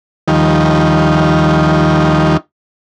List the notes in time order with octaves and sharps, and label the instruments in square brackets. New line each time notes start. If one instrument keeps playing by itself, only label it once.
[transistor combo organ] D#2 D#3 F3 G3